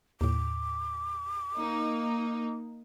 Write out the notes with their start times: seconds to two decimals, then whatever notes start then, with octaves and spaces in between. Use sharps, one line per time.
0.21 D#2 A2 D6
1.58 A#3 D#4